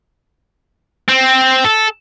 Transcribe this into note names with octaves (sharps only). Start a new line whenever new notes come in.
C4
A4